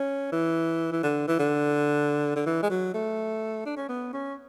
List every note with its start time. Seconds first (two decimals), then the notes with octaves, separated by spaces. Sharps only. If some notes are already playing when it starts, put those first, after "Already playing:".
Already playing: C#4
0.32 E3
0.92 E3
1.03 D3
1.28 E3
1.39 D3
2.36 D3
2.46 E3
2.62 G#3
2.70 F#3
2.94 A3
3.66 D4
3.77 C#4
3.89 B3
4.13 C#4